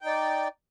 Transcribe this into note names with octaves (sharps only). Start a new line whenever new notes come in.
D#4 D5 G5